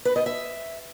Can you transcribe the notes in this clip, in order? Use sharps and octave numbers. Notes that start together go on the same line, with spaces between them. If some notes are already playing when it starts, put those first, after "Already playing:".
B4
D#5
E5